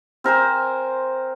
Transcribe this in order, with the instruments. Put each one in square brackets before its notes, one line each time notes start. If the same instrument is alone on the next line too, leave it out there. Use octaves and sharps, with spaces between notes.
[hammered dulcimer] C4 A#4 C5 G#5